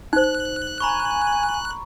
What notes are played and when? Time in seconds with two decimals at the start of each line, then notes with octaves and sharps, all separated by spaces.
0.13 D#4 C5 F#6
0.80 G#5 A#5 B5 C#6